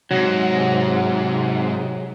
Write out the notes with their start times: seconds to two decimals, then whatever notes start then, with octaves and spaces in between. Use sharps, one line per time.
0.11 G#2 C3 F#3